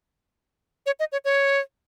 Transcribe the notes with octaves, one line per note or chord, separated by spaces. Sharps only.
C#5
D#5
C#5
C#5